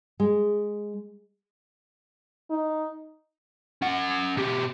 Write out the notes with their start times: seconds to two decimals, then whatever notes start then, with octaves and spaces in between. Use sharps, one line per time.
0.20 G#3
2.50 D#4
3.82 C#4 F#5
4.37 B2 G4